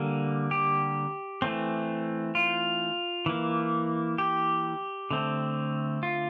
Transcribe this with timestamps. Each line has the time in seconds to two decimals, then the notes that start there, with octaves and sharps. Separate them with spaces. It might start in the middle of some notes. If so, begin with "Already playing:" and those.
Already playing: D3 G3 A#3
0.51 G4
1.42 E3 A3 C4
2.35 F4
3.26 E3 A#3
4.18 G4
5.11 D3 A3 C4
6.03 F4